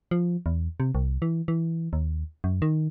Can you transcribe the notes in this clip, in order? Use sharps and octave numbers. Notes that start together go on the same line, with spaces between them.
F3
E2
C3
C2
E3
E3
D#2
F#2
D#3